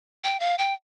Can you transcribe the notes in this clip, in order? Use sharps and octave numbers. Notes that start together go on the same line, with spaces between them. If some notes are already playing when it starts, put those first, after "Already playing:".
G5
F5
G5